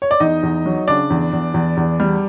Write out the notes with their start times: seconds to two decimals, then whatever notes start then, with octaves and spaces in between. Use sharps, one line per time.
0.02 C#5
0.11 D5
0.20 E2 D#4 D#5
0.43 E2
0.66 F#3
0.88 C#3 D4 D5
1.10 E2
1.33 E2
1.54 E2
1.77 E2
2.00 G3